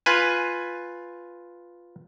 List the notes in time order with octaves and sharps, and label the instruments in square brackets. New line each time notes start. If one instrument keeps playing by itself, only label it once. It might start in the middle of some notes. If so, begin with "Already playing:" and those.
[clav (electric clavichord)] F4 B4 G#5